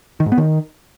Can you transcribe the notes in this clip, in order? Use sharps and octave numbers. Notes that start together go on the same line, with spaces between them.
D#3
G#2
B3
D#3